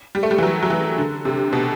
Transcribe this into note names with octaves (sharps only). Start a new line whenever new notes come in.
G3
A3
G3
E3
F#3
F#3
E3
D3
C3
B2